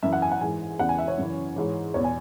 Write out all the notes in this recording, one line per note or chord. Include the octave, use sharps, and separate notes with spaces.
F#2 E3 E5
F#5
G#5
F#5
G#2 E3 G#5
E2 C#3 E3 F#5
G#5
E5
C#5
F#2 C#3 E3
G#2 E3
E2 B2 C#5
G#5